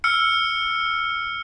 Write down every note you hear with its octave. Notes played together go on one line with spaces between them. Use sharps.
E6 F6 C#7